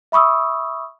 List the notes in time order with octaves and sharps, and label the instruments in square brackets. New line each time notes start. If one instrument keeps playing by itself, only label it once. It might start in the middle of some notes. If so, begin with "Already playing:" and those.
[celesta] E5 B5 C#6 D#6 E6